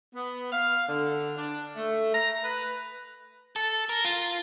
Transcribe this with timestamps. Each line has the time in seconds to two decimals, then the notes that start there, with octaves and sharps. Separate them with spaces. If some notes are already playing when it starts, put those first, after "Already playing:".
0.14 B3
0.52 F5
0.87 D3
1.38 D4
1.77 A3
2.14 A#5
2.44 B4
3.56 A4
3.89 A#4
4.05 F4